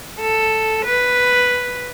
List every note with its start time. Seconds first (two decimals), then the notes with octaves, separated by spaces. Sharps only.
0.20 A4
0.85 B4